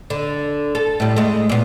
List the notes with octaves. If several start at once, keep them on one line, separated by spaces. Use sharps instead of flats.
D3
A4
A2 G3
G#3 A3
A#2 B3